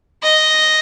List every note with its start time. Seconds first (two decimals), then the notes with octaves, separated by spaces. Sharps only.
0.23 D#5